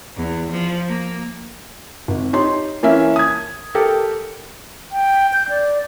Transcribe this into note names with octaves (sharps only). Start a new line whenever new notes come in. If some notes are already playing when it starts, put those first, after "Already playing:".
E2
F3
A#3
G#1
D#4 G4 C#5 C6
E3 A#3 C#4 E5
D#6 G#6
G4 A4 A#4 G5
G5
G6
D5